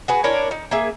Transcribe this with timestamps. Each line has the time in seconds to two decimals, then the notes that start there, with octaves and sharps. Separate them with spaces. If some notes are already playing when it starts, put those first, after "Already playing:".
0.08 F#4 G#4 B4
0.24 D4 E4 A#4 C#5
0.51 D#4
0.71 A#3 G#4 E5